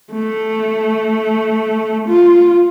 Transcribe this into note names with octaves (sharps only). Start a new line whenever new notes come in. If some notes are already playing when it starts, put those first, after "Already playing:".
A3
F4